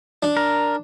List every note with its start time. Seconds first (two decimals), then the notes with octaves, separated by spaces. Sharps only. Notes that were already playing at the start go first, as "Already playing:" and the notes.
0.23 D4
0.37 A#4